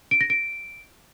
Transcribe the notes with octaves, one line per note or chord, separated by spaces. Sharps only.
D7
A#6
D7